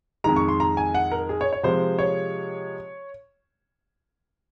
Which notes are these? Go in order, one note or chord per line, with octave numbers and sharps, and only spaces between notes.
F2 D#3 G#3 A#5
C#6
C6
A#5
G#5
F#5
A#4
G#4
C#5
C#5
C3 F3 G#3 C5
C#5